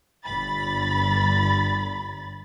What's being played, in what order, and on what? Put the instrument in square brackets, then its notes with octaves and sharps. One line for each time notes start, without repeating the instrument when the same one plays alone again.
[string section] G1 G2 B5 A6